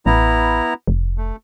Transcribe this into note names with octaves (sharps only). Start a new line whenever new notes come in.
A1 B3 E4 A#5
F1
A3